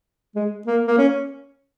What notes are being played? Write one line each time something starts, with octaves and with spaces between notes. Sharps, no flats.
G#3
A#3
A#3
C#4